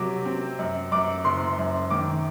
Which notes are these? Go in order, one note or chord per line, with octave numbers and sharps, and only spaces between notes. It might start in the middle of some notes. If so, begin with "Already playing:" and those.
Already playing: C3 F#3 D6
C4
F#2
F#2 D6
F#1 C6
F#2
D#3 D6